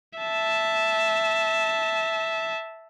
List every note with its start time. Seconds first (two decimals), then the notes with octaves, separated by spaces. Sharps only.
0.19 E5 A5